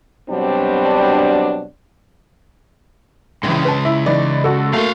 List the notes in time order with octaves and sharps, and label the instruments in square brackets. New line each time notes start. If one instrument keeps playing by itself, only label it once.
[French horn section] B2 F#3 G3 C4 D4
[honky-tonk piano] A#1 E3 [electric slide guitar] C#3 G#3
[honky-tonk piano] B4 A5
E4
E3 D#4 D5
F#4 A4
[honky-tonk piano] A3 A#3 [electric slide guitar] F#4 F5